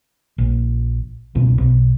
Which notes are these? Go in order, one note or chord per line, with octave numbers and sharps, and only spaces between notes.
A#1
C#2 B2
B1